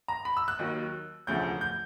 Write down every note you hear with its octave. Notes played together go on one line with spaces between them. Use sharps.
A#5
B5
E6
F#6
D#2 D#3 F#3
E1 D2 C#3 F3 G6
G6